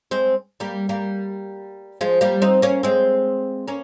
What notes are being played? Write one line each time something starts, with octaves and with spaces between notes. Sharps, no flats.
G#3 C4
G3 A#3
G3 A#3
F3 G#3
G3 A#3
C4 D#4
A#3 C#4
G#3 C4
A#3 C#4